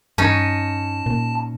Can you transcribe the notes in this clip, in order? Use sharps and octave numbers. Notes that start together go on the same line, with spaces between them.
G2 C#4 D#4 A5
A#2